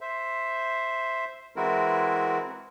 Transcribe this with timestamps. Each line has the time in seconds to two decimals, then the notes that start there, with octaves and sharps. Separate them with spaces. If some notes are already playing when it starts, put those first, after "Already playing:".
0.01 C5 E5
1.56 E3 G#3 C4 E4 F#4 A#4